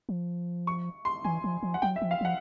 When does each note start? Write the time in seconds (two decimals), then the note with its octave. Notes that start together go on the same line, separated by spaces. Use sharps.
0.09 F3
0.67 C#6
1.05 C6
1.25 E3 G#5
1.44 F3
1.63 F3
1.74 F#5
1.82 F#3 G5
1.96 E5
2.02 F3
2.11 F5
2.21 F3 F#5